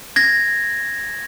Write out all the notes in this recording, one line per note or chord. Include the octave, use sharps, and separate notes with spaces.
G#6 A#6